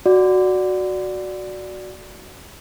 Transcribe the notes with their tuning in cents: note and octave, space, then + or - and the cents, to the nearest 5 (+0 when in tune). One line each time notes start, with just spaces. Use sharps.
F#4 +0 D5 +0